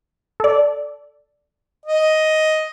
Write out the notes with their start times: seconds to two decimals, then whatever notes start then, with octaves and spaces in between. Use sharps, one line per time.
0.40 A4 D5
1.86 D#5